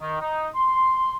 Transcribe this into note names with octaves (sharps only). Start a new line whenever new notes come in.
D#3
D#4
C6